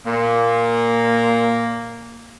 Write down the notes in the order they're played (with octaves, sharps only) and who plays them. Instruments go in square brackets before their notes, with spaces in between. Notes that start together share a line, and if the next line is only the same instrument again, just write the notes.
[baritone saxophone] A#2 [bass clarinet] A#3